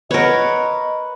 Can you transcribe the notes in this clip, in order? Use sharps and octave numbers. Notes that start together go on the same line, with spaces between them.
A#4 B4 C#5 D#5 F#5